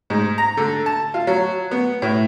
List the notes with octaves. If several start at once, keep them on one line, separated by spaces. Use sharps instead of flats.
G#2
A#5
D3
A5
F4
F#3
B3
A2